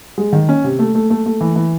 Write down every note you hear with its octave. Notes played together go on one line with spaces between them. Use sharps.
G#3
D#3
C#4
C3
A3
A3
A3
A3
E3
E3